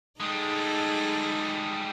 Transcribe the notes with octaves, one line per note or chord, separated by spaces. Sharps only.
G3 G#3 D#4 G#4 A4